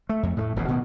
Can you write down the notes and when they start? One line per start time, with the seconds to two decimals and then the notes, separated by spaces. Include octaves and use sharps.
0.09 A3
0.23 F2
0.37 A2 G3 A3
0.56 D#1 A1 E2 B2
0.68 B2 D#3 B3